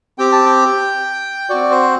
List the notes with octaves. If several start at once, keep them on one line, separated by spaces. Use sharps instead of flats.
C4 G4 G5
A5
G5
C4 F#4 D5
C5